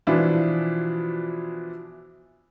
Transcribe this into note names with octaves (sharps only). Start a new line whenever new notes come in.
B2 E3 F3 D4 E4 F4